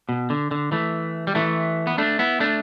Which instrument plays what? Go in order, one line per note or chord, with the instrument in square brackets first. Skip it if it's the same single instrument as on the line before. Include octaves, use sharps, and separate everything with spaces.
[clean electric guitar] B2
D3
D3
E3 A3
G3
E3 A3
B3
A3 D4
B3 E4
A3 D4